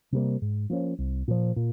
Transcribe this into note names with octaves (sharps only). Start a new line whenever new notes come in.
C3 G3 A#3
G#2
F3 A#3 C#4
C2
A#2 F3
A#2